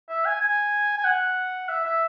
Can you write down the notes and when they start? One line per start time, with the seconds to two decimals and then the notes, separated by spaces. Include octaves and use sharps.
0.09 E5
0.25 G#5
0.41 G#5
0.98 G#5
1.05 F#5
1.69 E5
1.84 E5